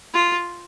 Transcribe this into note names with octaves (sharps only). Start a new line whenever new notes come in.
F4